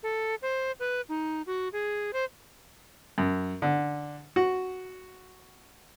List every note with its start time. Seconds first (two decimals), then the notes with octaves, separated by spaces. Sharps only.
0.03 A4
0.42 C5
0.80 B4
1.09 D#4
1.46 F#4
1.73 G#4
2.13 C5
3.18 F#2
3.62 D3
4.36 F#4